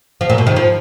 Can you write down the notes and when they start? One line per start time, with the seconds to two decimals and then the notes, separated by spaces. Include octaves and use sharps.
0.21 F3
0.30 A#2
0.38 B2
0.47 D#3
0.56 F3